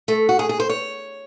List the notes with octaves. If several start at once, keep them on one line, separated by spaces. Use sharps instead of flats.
A3
F#4
G#4
G#4
C5
C#5